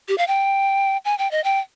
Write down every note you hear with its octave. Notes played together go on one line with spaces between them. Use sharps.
G4
F5
G5
G#5
G5
D#5
G5